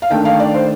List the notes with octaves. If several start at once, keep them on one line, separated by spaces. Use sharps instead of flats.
F5
D#3 A3 D4 G5
F5
D5
C5